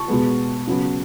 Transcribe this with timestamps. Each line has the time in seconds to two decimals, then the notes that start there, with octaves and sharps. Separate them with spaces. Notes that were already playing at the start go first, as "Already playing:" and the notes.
Already playing: A5 C#6
0.08 B2 G#3 B3
0.67 C#3 F#3 B3